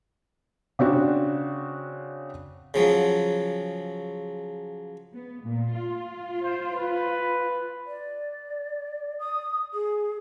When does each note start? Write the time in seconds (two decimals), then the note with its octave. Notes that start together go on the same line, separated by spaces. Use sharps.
0.79 C#3 C4 D4 F#4
2.74 C#3 F3 F#3
5.14 B3
5.44 A#2
5.74 F4
6.42 C5
6.73 B4
7.86 D5
9.19 D#6
9.74 G#4